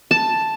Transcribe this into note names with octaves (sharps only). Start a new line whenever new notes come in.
A5